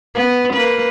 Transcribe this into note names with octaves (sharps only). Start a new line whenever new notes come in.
B3
A#3 B4